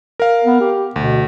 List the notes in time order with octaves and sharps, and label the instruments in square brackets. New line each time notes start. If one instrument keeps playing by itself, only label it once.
[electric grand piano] A#4 F5
[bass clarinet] B3
G4
[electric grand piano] D2 [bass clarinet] B2